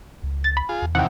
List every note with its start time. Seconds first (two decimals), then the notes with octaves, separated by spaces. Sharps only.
0.23 C#2
0.44 A6
0.57 B5
0.69 F4 G#4
0.82 E2
0.95 C3 D#3 E3 F#5 G5